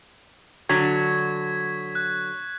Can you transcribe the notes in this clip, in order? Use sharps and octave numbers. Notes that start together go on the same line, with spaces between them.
D3 F#3 C#6 G#6 B6
F#6